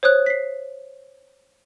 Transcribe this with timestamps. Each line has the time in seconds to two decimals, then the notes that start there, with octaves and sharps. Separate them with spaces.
0.03 C5 C#5 D#6 F#6
0.26 B6 C7